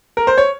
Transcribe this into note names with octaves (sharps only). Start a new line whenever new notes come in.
A#4
C5
C#5